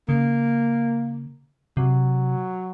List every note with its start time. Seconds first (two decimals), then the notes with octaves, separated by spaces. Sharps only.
0.08 C#3 A#3
1.77 C3 F#3